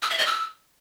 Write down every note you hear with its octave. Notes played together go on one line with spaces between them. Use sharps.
E6
E5
D#5
E6